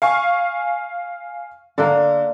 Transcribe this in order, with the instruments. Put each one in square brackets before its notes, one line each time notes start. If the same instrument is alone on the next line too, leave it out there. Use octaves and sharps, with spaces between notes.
[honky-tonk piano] F5 G#5 C#6
[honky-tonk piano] D3 [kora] A#3 D4